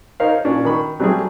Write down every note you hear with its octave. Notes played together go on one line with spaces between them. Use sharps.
D#4 A#4 C5 C#5 F5
A#2 C#4 D4
D#3 B5 C#6
F#3 G3 A3 C4 D4 G#4